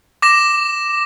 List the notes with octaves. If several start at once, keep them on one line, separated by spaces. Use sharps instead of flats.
D6 A#6 E7